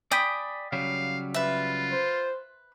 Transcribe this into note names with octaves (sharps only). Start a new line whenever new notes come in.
D5 G5 G#5 B5 D#6
C#3 F#3 G3 F5
F4 B4 E5
C5